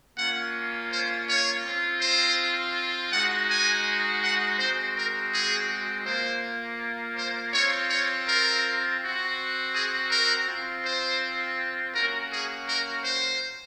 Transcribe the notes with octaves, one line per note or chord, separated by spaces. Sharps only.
A#3 C#4 F4 F#5
C5
C#5
C4 F4
C5
G#3 D#4 F#4 F#5
G#5
F#5
G#3 C4 F#4 C5
A#4
G#4
A#3 F4 C5
C5
C4 F4 C#5
C#5
A#4
C4 F#4
G#4
A#4
C4 F4
C5
A#3 C#4 F#4 A#4
G#4
A#4
C5